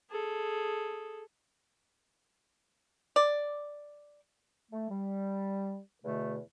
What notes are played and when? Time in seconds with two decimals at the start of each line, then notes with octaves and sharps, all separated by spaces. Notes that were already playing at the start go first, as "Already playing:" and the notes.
0.10 G#4 A4
3.16 D5
4.71 A3
4.89 G3
6.03 E2 B2 D3 A3